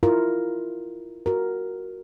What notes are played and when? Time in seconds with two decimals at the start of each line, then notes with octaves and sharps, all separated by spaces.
0.03 E4 F4 A#4
1.26 F#4 A#4